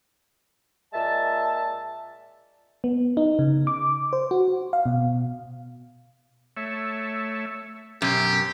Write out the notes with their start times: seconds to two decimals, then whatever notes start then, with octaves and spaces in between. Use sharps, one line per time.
0.93 A#2 G#3 E5 A5
2.84 B3
3.17 D#4
3.39 C#3
3.67 D6
4.13 C5
4.31 F#4
4.73 F5
4.86 B2
6.57 A3 C#5 E5
8.02 F#2 B2 G4